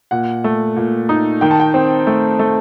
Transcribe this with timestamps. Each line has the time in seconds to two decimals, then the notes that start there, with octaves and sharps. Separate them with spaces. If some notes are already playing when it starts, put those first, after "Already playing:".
0.11 A#2 F#5
0.44 A3
0.77 A#2
1.09 D#4
1.41 D#3 G5
1.51 A5
1.60 G5
1.74 C4
2.07 A3
2.39 A3